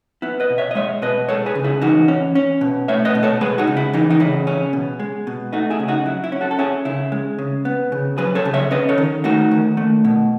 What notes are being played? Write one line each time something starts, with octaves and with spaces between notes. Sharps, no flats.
B3 E4
B4 D#5
B2
C#5 E5
D#5
G#3 C#5 E5
B2 B4 D#5
G#3 A4 C#5
G#4 B4
C#3
E4 G#4
E3 D#4 F#4
C#4
C#4
B2
A3 C#5 E5
B4 D#5
B2
A4 C#5
G#3 G#4 B4
D#4 F#4
C#3
E4
E3 D#4
D#4
C#3 E4
C#4
B2
G#3
B2
A3 D#4 F#4
E4 G#4
C#3
D#4 F#4
F#3 E4
E4
C#4
F#4 A4
A4
C#4 E4 G#4
C#3 E4
G#3
C#3
B3
C#3
F#3 G#4 B4
A4 C#5
C#3
C#5 E5
C#4 B4 D#5
A4 C#5
D#3
A3 D#4 F#4
D#3
A3
B2